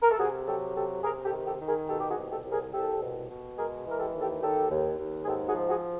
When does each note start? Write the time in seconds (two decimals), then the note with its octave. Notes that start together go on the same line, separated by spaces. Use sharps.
0.02 A#4
0.11 A4
0.19 C3 F#4 G#4
0.47 F#3 G4 A4
0.76 C3 G4 A4
1.03 C3 G#4 A#4
1.25 G4 A4
1.32 D#3
1.46 G4 A4
1.60 D#3
1.67 G#4 A#4
1.88 B2 G4 A4
2.00 G4
2.09 F#4 G#4
2.17 C2
2.31 G4 A4
2.45 C2
2.52 G#4 A#4
2.73 C2 G4 A4
3.01 B2
3.30 B2
3.57 G#3 G#4 A#4
3.86 E3 A#4
4.00 G4 A4
4.14 D#2
4.21 G4 A4
4.42 D#2 G4 A4
4.71 D#2
4.98 D#2
5.23 G#4
5.27 G#2 G4 A4
5.47 F#4 G#4
5.55 F3
5.69 F#4 G#4